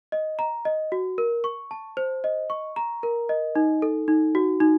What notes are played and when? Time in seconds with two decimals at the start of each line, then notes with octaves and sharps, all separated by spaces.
0.12 D#5
0.39 A#5
0.65 D#5
0.92 F#4
1.18 A#4
1.44 C#6
1.71 A5
1.97 C5
2.24 D#5
2.50 C#6
2.76 A#5
3.03 A#4
3.29 D#5
3.55 D#4
3.82 A4
4.08 D#4
4.35 F#4
4.60 D#4